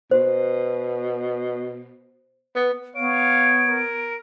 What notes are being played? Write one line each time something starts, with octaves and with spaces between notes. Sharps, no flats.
B2 C5
B3
B3 C#5 F5 D7
A#4